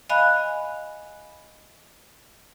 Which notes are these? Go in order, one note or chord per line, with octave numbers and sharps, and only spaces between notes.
D#5 F5 G#5 B5 F#6